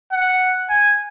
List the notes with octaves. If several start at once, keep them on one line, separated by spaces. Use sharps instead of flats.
F#5
G#5